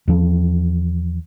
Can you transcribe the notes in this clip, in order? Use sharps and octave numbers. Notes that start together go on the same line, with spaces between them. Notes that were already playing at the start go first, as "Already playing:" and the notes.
E2 F3